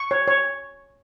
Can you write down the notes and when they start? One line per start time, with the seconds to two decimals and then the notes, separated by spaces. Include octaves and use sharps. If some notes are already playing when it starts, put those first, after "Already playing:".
Already playing: C#6
0.11 C#5
0.28 C#5